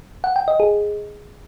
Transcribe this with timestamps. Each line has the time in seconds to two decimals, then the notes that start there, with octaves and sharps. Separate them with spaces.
0.24 F#5
0.36 G5
0.48 D#5
0.60 G#4